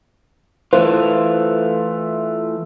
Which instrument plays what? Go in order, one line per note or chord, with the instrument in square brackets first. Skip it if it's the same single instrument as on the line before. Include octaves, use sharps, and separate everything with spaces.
[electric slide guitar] E3 A3 F4 [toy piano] C5